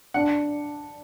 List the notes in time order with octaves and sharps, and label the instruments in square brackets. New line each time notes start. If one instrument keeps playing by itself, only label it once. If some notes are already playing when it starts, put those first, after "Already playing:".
[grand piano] D4 [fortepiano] F#5